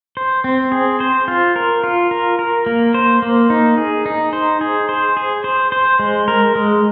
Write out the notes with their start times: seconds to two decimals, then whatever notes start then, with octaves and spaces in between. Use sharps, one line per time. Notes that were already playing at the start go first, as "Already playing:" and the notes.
0.17 C5
0.44 C4
0.72 G#4
1.00 C5
1.28 F4
1.56 A#4
1.84 F4
2.11 A#4
2.39 A#4
2.66 A#3
2.94 C5
3.22 A#3
3.50 D#4
3.78 G#4
4.06 D#4
4.33 C5
4.61 G#4
4.89 C5
5.17 G#4
5.44 C5
5.72 C5
5.99 G#3
6.28 A#4
6.55 G#3